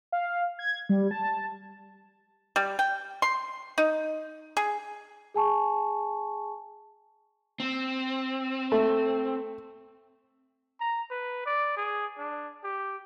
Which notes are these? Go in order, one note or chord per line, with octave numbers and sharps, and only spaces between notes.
F5
G#6
G3
A5
G3
G5
C6
D#4
G#4
G#4 G#5 A5 C#6
C4
A3
A#5
B4
D5
G#4
D4
G4